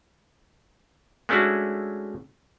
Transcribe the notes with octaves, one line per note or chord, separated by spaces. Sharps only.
G#3 A3 C#4 D4 E4 F#4